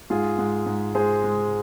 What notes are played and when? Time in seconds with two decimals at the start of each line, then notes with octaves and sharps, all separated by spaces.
0.10 G#2 F4 G#4
0.38 G#2
0.66 G#2
0.95 G#3 G#4 C5
1.24 G#3